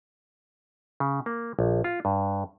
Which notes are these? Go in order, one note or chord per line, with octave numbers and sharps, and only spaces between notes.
C#3
A#3
A#1
F4
G2